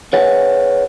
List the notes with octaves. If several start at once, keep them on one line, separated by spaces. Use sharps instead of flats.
G#4 B4 C#5 F#5